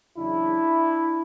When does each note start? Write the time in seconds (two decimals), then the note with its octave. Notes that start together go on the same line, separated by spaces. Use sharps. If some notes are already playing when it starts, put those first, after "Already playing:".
0.17 E2 C#3 F#3 D4 E4